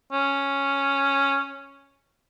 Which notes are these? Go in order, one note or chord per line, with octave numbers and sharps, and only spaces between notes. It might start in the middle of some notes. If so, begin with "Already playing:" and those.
C#4